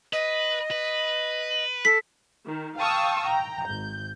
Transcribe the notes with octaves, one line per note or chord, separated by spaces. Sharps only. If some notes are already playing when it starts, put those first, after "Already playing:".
B4 D#5
B4
A4 B6
D#3
F5 G5 A5 C#6 D#6 E6
G5 A#5
G#1 G6